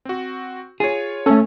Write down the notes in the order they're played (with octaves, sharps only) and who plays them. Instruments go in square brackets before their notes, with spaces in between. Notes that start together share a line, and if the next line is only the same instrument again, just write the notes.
[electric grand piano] C4 F#4
[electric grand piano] F4 C#5 [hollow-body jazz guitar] G#4
[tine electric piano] A3 A4 [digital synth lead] C#4